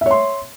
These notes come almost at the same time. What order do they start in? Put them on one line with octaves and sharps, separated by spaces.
E5 C#5 C6